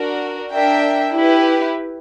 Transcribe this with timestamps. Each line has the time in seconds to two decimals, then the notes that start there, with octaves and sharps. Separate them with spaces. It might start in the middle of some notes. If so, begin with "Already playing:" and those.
Already playing: D4 F#4 A#4
0.51 D4 A#4 E5 G5
1.14 E4 G4 B4